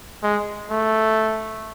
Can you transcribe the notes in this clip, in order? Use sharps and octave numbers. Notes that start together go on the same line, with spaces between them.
G#3
A3